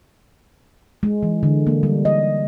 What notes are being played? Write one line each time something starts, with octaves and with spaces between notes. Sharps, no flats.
G#3
E3
D3
A#3
G3
D#5